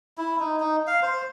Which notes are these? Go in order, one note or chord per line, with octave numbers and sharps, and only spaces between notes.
E4
D#4
D#4
F5
C5